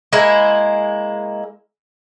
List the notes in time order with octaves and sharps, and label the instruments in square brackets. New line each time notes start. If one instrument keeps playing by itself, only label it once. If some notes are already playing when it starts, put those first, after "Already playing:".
[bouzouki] G#3 A#3 E4